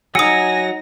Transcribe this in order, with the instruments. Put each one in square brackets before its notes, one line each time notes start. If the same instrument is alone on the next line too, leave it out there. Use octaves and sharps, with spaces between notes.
[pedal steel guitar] F#3 F#5 [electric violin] D#4 A#6 [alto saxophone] G#5 [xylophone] D#6 E6